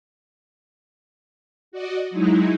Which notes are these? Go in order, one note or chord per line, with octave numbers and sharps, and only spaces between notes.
F#4 D5 D#5
F#3 G#3 D#4 E4